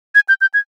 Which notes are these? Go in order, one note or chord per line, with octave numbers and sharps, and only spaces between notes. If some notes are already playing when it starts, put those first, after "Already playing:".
G#6
G6
G6
G#6